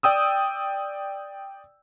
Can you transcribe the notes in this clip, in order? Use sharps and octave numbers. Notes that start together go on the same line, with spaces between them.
D5 G5 D#6 E6